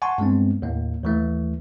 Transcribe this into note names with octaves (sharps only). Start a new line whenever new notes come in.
F#5 G#5 A5 C6 C#6
G2 G#3 B3 C4
D#2 A2 A#3
D#2 E3 A3